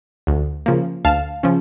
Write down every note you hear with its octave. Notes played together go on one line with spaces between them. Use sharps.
D2
C#3 F3 A#3
D2 F5 A5
C#3 F3